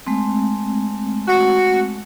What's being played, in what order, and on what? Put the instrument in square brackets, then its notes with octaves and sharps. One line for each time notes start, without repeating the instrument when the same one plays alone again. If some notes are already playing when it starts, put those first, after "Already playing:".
[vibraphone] G#3 A3 C4
[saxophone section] F#4